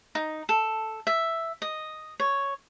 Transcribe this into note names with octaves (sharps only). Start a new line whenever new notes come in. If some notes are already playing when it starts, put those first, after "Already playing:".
D#4
A4
E5
D#5
C#5